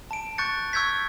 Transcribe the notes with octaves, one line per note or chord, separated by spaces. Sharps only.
A5 D7
C#6 F#6 G6 A6 C#7
C#6 E6 G6 G#6 B6